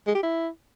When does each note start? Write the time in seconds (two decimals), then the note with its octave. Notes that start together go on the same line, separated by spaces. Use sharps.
0.07 G#3
0.15 G4
0.23 E4